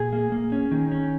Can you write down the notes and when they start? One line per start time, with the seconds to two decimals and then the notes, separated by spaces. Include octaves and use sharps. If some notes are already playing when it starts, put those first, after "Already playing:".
Already playing: A#2 G#4
0.13 A#3
0.32 A#3
0.52 C#4
0.71 D#3
0.92 C#4